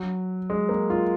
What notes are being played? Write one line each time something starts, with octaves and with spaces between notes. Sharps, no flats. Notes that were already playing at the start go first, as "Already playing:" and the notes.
Already playing: F#3
G#3
A#3
F4